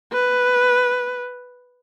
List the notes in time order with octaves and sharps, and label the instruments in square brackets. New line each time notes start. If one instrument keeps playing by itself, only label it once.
[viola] B4